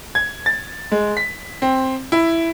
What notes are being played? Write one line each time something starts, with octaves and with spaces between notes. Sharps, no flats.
G#6
A6
G#3
B6
C4
E4